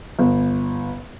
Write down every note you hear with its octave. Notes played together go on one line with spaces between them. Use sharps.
G1